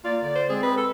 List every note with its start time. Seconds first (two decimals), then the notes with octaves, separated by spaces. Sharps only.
0.04 A#3 F4 D5
0.22 D3 D5
0.35 C5
0.49 G#3 C4 G#4
0.63 B4
0.77 A4